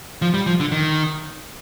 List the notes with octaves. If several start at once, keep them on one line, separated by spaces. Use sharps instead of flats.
F3
G3
F3
D3
D#3